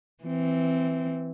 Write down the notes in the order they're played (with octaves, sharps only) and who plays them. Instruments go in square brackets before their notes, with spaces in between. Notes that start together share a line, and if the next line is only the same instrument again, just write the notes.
[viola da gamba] E3 C4